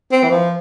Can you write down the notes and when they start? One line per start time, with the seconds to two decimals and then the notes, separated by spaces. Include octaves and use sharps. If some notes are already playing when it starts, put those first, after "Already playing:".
0.12 C4
0.24 E3
0.31 F3